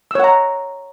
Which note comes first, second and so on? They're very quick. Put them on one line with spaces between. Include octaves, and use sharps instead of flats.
E6 C#5 F#5 A#5